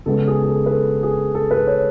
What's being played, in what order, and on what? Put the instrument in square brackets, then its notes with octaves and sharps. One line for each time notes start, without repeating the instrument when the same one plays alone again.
[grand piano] C#3 G#3 B3 A4
G#4
G#4
A4
B4
A4
G#4
A4
B4
C#5